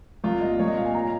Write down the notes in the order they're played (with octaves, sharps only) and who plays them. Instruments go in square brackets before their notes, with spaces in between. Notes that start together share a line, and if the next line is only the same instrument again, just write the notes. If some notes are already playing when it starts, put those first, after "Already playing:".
[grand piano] C2 F4
A#2 D#5
C2 C#5
D#5
A#2 F5
G#5
A#5